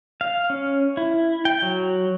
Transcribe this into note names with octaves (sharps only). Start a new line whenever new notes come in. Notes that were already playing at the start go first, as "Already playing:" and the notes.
F5
C#4
E4
G5
F#3